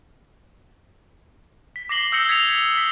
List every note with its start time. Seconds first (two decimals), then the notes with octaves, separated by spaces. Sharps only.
1.76 B6
1.89 D6 A#6 C7 F#7 G7
2.12 D#6 E6 G6 A#6 C#7 G7
2.29 G#6 B6 C#7 F7
2.49 G7
2.78 B6